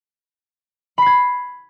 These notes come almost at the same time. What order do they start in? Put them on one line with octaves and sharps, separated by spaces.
B5 C7 G#6